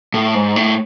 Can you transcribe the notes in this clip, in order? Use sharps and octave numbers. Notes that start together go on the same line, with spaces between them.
A2
G#2
A2